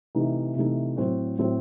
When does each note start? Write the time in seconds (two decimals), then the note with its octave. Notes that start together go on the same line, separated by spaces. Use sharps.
0.15 C3 E3 A3 D#4
0.56 C3 E3 A3 D#4
0.97 A2 F#3 C4 F#4 C5
1.38 A2 F#3 C4 F#4 C5